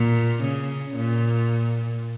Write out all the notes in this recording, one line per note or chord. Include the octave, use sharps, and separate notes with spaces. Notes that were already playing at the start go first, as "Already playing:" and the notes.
Already playing: A#2
C#3
A#2